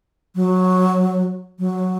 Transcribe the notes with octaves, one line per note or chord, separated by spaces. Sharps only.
F#3
F#3